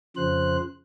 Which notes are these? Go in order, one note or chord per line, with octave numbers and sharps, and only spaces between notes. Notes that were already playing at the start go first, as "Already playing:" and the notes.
F2 C#3 F3 C5 F#6